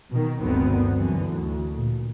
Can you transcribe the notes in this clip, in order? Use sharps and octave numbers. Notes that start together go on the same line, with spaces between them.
B2 D#3
G1 D2 D3 D#3 B3 C4
F#2 D3 E3
D2
A#2